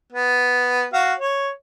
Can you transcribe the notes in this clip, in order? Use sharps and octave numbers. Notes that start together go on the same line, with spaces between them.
B3
F#4 F5
C#5